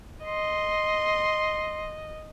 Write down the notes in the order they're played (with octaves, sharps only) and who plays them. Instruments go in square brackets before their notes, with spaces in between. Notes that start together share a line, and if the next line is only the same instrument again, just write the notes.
[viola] D#5 [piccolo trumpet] C6